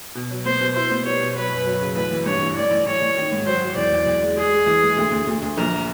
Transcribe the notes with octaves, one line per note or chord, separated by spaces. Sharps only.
B2
F#3
B3 C5
B2
E4 C5
B3
G3 C#5
B2
F#3 B4
F#2
F#3
C#3
A1 B4
E3
G2 C#5
E3
A1 D5
A1
A1 C#5
A1
D#3
G#2
F#3 C5
F#3
E2 D5
E2
E2
G#3
G#3 G#4
G#3
E3
G#3
D2
D2
D2
D2
A#1 A#4